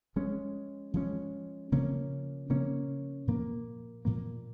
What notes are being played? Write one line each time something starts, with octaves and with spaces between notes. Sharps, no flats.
F3 G#3 C#4
F3 G#3 C#4
C#3 F3 A#3 C#4
C#3 F3 A#3 C#4
A#2 F3 A#3
A#2 F3 A#3